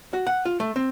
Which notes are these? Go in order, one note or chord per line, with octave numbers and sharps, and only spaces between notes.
F#4
F#5
F4
A3
C4